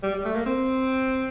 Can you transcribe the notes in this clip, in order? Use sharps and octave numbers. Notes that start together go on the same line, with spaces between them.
G3
G3
A3
A#3
C4